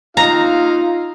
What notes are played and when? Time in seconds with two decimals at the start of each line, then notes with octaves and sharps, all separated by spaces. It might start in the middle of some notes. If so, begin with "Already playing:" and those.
0.17 D#4 F4 F5 A#5